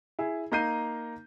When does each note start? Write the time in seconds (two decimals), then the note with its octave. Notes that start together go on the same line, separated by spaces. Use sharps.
0.19 E4 G#4
0.52 A#3 D#4 A#5 G6 C7 D#7